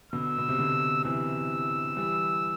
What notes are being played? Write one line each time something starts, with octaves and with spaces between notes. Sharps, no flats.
B2 D3 E6
B2
C3
B2 D3
C3 E3 E6
E3 G3